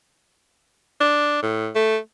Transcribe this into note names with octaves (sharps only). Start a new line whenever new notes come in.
D4
A2
A3